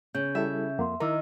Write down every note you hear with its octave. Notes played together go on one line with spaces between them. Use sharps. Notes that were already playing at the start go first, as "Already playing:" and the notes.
C#3 G6
G3 E4 A4 E5
F2 A#3 F#5 C6
D#3 E4 A#4 D6 E6